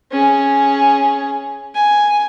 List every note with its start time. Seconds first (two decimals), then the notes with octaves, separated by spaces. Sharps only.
0.12 C#4 G#4
1.75 G#5